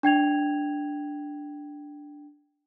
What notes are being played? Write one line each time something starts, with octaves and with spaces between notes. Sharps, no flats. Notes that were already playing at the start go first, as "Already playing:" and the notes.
D4 G5 G#6 F7